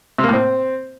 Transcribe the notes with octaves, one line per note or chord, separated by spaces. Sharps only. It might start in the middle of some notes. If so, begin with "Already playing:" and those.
C3
A#3
A2
C4